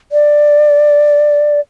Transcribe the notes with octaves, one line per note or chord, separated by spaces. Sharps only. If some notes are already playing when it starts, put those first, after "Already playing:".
D5